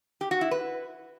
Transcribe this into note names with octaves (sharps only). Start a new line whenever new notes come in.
G4
F#4
E4
B4